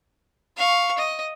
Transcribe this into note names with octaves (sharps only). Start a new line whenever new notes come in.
F5 C#6
D#5